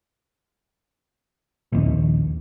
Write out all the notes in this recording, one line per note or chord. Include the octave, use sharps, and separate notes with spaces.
A#1 D#2